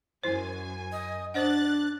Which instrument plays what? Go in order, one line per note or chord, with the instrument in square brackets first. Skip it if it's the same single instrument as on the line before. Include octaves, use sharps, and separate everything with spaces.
[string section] F#2 G#5 [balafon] E4 C5
[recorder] D#5
[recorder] D4 [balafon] C5 D#5 F#5 [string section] F#6 A6